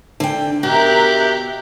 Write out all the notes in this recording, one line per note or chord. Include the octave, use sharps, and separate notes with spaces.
D3 G5
B2 G4 A#4 E5 F#6